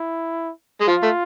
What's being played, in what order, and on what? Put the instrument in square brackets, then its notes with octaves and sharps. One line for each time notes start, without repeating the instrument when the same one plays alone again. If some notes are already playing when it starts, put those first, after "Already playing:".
Already playing: [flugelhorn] E4
[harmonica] G#3
[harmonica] F3 [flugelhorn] F4
[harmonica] A3